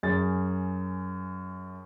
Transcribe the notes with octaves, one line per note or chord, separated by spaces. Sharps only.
F#2 G#4 A6